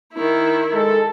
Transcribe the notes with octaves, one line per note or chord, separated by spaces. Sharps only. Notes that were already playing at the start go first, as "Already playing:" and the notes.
D#3 E4
G#3 A4